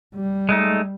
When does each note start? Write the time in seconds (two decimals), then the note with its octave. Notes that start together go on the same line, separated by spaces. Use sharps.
0.15 G3
0.49 G#3 A3 D#4